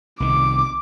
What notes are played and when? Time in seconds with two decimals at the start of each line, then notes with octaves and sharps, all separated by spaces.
0.20 C2 D#3 D6